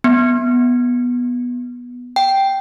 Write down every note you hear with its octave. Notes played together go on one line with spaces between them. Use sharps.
B3
G5